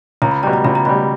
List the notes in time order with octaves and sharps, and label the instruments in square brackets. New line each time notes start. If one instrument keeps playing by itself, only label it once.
[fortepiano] C#2 [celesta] A#5
[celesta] B5
[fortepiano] B2 G3 [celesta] A#5
[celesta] A#5
[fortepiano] C#2 [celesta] B5
[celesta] A#5
[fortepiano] B2 G3 [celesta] B5